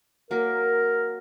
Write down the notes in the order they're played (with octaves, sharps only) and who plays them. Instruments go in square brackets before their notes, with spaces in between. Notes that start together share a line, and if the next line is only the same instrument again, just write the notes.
[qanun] F#3 A#3 [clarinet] A#4